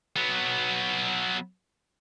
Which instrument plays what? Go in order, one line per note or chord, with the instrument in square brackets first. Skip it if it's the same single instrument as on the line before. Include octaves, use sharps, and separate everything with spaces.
[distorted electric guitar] F#3 B3